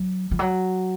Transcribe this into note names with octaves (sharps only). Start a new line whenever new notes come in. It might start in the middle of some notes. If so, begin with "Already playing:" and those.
Already playing: F#3
F3
F#3